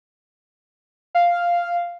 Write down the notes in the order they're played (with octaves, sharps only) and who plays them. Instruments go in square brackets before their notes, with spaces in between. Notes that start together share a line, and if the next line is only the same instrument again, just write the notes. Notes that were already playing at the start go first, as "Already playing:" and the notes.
[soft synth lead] F5